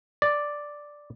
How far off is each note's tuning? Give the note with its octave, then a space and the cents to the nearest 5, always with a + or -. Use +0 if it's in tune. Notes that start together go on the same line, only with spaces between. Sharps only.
D5 +0